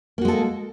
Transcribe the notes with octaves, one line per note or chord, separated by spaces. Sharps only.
G#3 A#3 F#4 A4